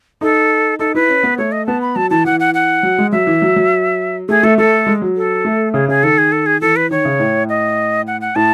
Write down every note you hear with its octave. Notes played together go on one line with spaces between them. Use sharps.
D#4 A4
D#4 A4
E4 B4
C#4
B3
A3 C#5
D#5
B3 A5
B5
F#3 A5
E3 A5
E3 F#5
F#5
F#5
F#3
G#3
F#3 E5
E3
F#3
F#3
A3 G#4
A3 A4
A3 A4
G#3
F#3
A4
A3
C#3 G#4
C#3 G#4
D#3 A4
G#4
A4
G#4
E3 A4
B4
D#3 C#5
C#3
A2
D#5
F#5
F#5
A2 A5